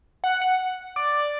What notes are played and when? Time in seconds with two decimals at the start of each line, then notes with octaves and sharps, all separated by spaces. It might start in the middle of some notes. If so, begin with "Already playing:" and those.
0.24 F#5
0.42 F#5
0.96 D5